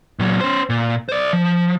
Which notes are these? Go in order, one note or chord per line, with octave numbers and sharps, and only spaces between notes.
A#2 F#3
C#4 C5
A#2
C5 D5
F3